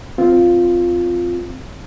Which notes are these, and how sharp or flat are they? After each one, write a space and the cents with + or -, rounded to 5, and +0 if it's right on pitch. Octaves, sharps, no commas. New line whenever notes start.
C4 -10 F4 +0